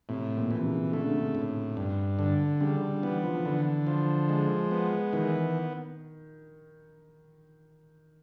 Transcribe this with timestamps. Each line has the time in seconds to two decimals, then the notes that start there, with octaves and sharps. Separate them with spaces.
0.09 A2 C3
0.37 A#2
0.51 E3
0.58 C3
0.65 C#3
0.93 D3 A3
1.01 C#3
1.09 C3
1.17 C#3
1.35 A2
1.77 G2
2.19 D3
2.60 C#3 G3
2.82 D3
3.03 E3 B3
3.23 F3
3.45 D3 E3
3.87 F3
4.29 G#3
4.71 B3
5.13 D#3 E3